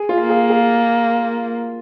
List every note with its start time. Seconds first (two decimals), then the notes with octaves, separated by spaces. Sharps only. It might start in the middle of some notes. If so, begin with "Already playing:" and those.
Already playing: G#4
0.09 F4
0.19 A#3
0.29 G#4
0.50 G#4